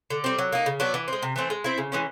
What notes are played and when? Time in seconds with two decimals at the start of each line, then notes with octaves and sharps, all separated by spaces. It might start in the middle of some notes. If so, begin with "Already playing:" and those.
0.10 D3
0.24 G3 C4
0.39 F#3
0.53 A#3 D#4
0.66 C#3
0.80 F#3 B3 D4
0.94 E3
1.08 G#3 C4
1.22 C3
1.36 E3 A3 C4
1.50 G#3
1.64 C4 E4
1.78 C#3
1.92 E3 G#3 C#4